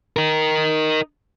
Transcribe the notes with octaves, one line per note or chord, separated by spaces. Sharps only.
D#4 A#4